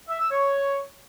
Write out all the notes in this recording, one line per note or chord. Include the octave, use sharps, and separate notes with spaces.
E5
E6
C#5